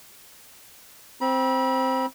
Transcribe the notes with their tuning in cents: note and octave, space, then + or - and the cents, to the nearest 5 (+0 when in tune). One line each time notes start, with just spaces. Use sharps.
C4 +0 B5 -35